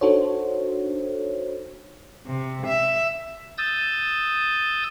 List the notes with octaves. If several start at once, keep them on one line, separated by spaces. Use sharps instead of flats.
D4 D#4 F#4 A4 C5 C#5
C3
E5
D#6 E6 G6 A6